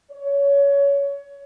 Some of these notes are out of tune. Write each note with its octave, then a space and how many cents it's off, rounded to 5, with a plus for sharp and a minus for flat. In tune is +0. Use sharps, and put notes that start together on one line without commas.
C#5 +20